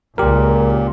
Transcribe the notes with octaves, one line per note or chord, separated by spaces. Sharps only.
C#2 A#2 G4 A#4